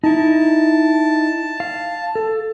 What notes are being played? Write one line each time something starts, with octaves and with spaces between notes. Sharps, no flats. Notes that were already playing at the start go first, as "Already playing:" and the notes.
D#4 E4 A5
F5
A4